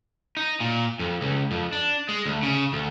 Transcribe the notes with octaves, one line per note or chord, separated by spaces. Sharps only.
D#4
A#2
F2
C#2
F2
D4
G#3
D2
C#3
D2